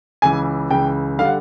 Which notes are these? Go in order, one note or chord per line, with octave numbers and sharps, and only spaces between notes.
C#2 C#3 E3 G#5
C#2 C#3 E3 G5
D3 G3 F5
F#5